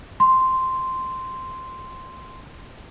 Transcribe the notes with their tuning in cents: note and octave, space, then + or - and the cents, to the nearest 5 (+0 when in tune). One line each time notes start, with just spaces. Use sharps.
C6 -5